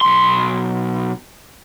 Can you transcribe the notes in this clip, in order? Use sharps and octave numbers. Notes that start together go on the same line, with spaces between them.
B1 C6